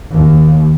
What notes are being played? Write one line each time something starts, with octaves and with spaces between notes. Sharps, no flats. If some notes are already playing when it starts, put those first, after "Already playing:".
D#2